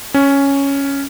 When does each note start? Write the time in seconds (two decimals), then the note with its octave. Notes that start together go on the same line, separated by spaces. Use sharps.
0.14 C#4